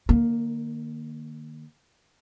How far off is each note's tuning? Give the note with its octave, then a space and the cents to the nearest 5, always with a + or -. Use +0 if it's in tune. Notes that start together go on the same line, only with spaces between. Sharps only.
D#3 -40 A#3 +0